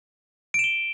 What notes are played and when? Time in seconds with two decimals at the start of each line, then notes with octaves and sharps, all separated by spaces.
0.54 D7
0.59 E7
0.64 G7